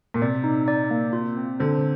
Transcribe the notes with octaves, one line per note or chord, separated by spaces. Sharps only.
A#2
C3 D5
D#4
D5
A#3
F4
C4
D3 C5